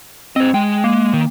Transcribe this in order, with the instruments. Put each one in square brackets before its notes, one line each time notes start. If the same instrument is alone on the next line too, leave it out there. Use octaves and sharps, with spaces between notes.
[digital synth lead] C4 [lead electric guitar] C5 D#5
[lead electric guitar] G#3 [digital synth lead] G5
[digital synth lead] A#3
[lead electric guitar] D#3